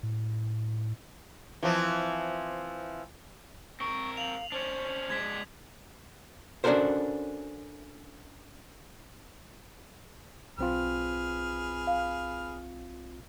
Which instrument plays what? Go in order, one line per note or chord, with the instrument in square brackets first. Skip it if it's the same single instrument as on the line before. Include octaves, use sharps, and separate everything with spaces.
[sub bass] A2
[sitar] E3 F3 C4
[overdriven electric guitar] C4 A#4 [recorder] C#6
[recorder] F5 [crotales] F7 F#7
[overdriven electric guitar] C#4 D4 [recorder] C5
[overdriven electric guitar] G#3 D4 [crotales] G#6 B6
[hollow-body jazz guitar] C#4 D4 F#4 A4 A#4 C5
[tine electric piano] B1 C4 F4 [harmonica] G#4 B4 F6
[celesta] F5